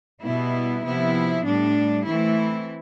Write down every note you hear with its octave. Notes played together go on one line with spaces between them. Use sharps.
B2 G3 B3 E4
C3 F3 B3 E4
A2 G3 D4
E3 A3 C4 E4